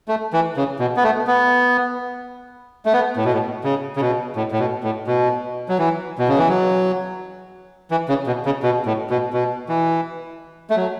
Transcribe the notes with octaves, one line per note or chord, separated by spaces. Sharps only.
A3
E3
C#3
B2
B3
A3
B3
A3
B3
A2
B2
A2
C#3
C#3
B2
A2
A2
B2
A2
B2
F#3
E3
B2
C#3
E3
F#3
E3
C#3
B2
C#3
B2
A2
B2
B2
E3
A3
F#3